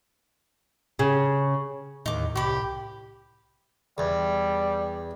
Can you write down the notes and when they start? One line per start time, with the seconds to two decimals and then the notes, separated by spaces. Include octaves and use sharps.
0.99 C#3
2.06 D#2 A2 D#4 D6
2.36 C2 G4 B5 D6
3.98 E2 G3